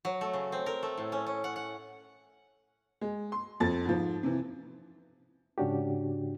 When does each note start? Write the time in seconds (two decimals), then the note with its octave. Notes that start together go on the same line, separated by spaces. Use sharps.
0.05 F#3
0.21 A3
0.34 C#3
0.52 C4
0.66 A#4
0.83 A3
0.98 A2
1.12 C#4
1.27 C#4
1.44 F#5
1.56 F#5
3.01 G#3
3.32 C6
3.60 F2 A4 A6
3.85 G#2 F3
4.23 C3 E3
5.58 G#2 C#3 C#4 D4 F#4 G4